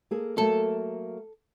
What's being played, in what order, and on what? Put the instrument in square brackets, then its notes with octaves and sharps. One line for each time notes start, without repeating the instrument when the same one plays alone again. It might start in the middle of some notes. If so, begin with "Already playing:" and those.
[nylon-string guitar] A#3 G#4 A4
[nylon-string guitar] F#3 A3 A#3 [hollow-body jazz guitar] A4